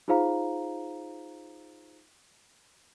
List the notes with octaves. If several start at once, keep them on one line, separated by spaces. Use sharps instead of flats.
D#4 F4 G#4 C5 F5 A#5